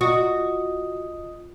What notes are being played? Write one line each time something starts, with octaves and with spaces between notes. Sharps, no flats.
F4 F#4 D#5 D#6